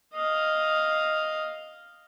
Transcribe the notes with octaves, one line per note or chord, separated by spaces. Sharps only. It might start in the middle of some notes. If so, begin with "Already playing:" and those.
D#5 F5